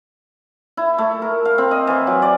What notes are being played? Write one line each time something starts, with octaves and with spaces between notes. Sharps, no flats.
E4
A3
A#4
F5
C4
D#5
E3
F#3
D5